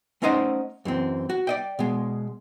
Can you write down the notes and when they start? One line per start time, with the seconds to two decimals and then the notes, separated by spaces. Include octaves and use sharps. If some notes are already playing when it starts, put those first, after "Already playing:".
0.22 A3 C#4 D#4 C5 D#5 F#5
0.85 F#2 E3 C4
1.30 F#4
1.47 D5 D#5 G5
1.79 B2 G#3